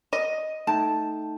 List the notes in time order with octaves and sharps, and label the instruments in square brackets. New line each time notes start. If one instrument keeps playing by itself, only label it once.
[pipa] D#5
[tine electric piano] A3 D#4 G5 [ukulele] A5